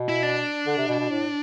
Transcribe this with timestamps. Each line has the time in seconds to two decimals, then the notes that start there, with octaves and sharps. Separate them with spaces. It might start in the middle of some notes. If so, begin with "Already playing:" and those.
Already playing: B2
0.09 E4
0.23 D4
0.67 D3
0.78 C3
0.88 B2
0.99 B2
1.10 A2